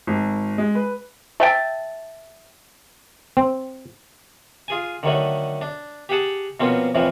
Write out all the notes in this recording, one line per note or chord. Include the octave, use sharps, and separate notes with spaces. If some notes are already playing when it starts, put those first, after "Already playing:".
G#1
G#3
B4
A3 E5 G5 A5
C4
F4 G#4 G#5
D3 D#3 F#3 A3
D4
G4 G#4 F#5 A5
B2 F3 A#3 C4 C#4
F2 A2 E3 F3